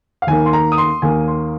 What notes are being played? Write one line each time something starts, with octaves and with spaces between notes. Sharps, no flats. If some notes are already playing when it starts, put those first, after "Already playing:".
F5
D#2 D#3 A#3 G#5
C6
A#5
D#6
C6
D#2 D#3 A#3 G#5
C6